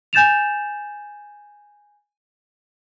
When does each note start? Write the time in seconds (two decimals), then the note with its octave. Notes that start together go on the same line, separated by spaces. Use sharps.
0.13 G#5 G6 A6 E7 F7